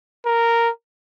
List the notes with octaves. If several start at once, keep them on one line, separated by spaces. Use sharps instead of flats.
A#4